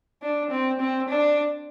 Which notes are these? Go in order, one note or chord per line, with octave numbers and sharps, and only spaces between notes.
D4
C4
C4
D4